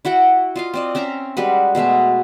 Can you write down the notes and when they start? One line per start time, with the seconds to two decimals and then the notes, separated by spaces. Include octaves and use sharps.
0.05 E4 F#4 F#5 G5
0.56 F4 D#5 F5
0.74 C4 D5 D#5
0.95 C4 C#4 E5 A#5
1.37 G3 G#3 F#4 B4
1.75 B2 G#3 A3 E5